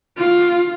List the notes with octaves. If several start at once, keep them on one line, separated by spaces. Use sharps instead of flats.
F4